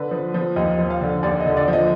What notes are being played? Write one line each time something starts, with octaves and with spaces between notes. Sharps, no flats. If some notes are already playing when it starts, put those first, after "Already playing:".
Already playing: D3 B4
F3
F3
D#2 D#5
F3
F5
D3
D#2 D5
D#5
D3
D5
F3
D#5